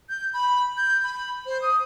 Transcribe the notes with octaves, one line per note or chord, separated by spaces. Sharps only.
G6
B5
G6
B5
C5
D#6